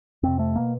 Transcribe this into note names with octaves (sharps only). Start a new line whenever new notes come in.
F2 C3 C4
A3
B2 A#3